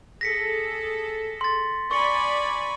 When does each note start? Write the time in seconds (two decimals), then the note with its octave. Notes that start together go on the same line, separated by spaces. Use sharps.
0.21 G#4 A4 A#6 B6 C#7
1.41 C6 A6
1.91 D5 G#5 B5 C#6 C#7